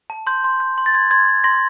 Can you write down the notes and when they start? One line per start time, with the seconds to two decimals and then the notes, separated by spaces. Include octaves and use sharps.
0.10 A5
0.27 C6 G6
0.44 C6
0.60 G6
0.78 C6
0.86 A6
0.94 C6 G#6
1.11 C6 G#6
1.28 C6
1.44 C6 A#6